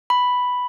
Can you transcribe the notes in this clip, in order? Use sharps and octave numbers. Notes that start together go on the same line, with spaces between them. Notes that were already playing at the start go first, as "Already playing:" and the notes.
B5